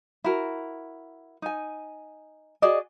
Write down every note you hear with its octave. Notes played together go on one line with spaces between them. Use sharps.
E4 F#4 A#4
D#4 G#5
F#4 G#4 D5 D#5